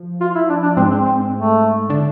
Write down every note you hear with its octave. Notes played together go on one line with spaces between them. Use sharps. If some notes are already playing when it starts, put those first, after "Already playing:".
Already playing: F3
F4
E4
D4
D4
G#2 G#3 C4
C4
C4
A3
D3 D4